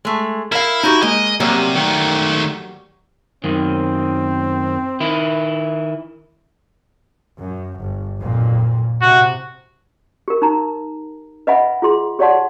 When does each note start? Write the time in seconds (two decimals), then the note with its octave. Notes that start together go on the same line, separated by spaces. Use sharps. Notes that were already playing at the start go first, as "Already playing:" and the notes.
0.05 G#3 A3
0.52 E4 A#4 F5
0.83 D#4 F#4 G4
1.02 G#3 A#3 D#5
1.40 C3 F#3 G3 A#3
1.75 D#3 A3
3.44 F#2 D#3 C4
5.00 D#3 E4
7.39 F#2
7.78 G1
8.21 B1 F2 A#2
9.02 A2 C3 F#4
10.28 G4 A#4
10.42 D#4 A#5
11.47 B4 D#5 E5 F#5 G#5 B5
11.82 F4 G#4 C6
12.19 G4 C#5 D5 F#5 A5 C6